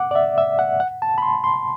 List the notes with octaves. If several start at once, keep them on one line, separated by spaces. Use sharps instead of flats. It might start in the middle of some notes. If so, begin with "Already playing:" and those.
Already playing: F#5 D6
D5
E5
E5
F#5
F#5
A5
B5
C6
C6